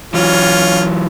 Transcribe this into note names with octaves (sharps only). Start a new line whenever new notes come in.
E3 F#3 C#4 F4